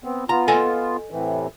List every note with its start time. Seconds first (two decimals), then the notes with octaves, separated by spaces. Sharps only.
0.04 B3 C4
0.29 B3 F4 A#5
0.48 A4 D#5 G#5
1.11 A2 C3 E3